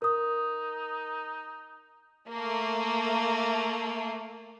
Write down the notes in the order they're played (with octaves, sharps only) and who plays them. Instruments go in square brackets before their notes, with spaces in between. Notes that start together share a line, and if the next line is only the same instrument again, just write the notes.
[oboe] D#4 [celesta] A#4 D#6
[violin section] A3 A#3